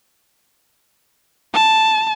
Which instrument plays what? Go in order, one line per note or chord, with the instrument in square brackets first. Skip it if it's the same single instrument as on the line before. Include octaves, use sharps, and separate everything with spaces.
[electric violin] A5